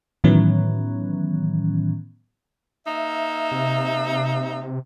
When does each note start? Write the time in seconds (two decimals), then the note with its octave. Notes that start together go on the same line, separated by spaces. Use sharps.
0.24 A2 D#3 E3 F#3 B3 C#4
2.87 A#3 D#4 E5
3.51 C3